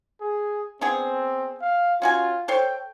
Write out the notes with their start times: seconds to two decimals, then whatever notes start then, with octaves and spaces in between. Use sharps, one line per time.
0.21 G#4
0.81 B3 C4 D4 G#4
1.61 F5
2.02 C#4 F4 F#4 G#5
2.48 A4 C5 C#5 G5